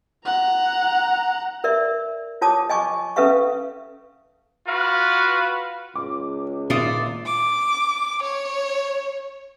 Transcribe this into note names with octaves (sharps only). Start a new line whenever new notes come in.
F#5 A#5
A#4 D5 E5
F4 C#5 A5 D6 D#6
D#5 G#5 C#6 D6
C#4 A4 B4 E5 F5 C#6
F4 F#4 B4 F5
C#2 D6
G#1 A#2 F4 D5 E5 D#6 E7
D6
C#5